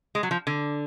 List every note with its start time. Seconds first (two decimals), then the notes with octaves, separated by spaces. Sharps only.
0.15 G#3
0.23 F#3
0.31 F3
0.47 D3